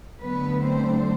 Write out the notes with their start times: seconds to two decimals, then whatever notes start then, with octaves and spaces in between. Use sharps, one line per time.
0.21 D#2 D3 F#3 A3 B3 B4
0.62 C4 C5